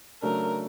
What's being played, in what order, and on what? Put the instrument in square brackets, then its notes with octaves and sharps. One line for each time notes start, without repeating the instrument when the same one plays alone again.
[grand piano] C#3 F#3 A3 D4 [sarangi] A#4